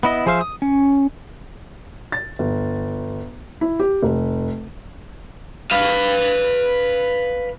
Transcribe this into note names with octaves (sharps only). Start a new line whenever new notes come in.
B3 E4 D#5
F3 G#4 C5 E5 F5
D#6
C#4
A6
G1
E4
G4
F1
B4 F5